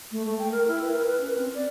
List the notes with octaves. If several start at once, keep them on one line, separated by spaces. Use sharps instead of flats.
A3
A3
G5
A#4
E4
B4
A#4
B4
C#4
C4
D5